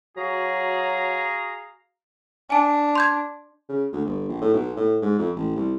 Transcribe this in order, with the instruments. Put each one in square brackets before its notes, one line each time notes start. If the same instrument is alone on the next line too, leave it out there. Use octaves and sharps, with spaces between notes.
[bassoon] F#3 [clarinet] F#4 [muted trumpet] G#4 [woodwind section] F5 A#5
[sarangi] D4 [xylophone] G#5 A5
[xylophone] C6 G6 G#6
[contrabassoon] C#3
D2
G1
A#1
A2
B1
A2
G#2
F2
A1
C2